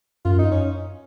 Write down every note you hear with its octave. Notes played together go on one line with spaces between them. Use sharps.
F#2 F4
D#4
C#4